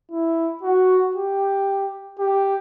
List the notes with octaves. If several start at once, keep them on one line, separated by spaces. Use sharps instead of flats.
E4
F#4
G4
G4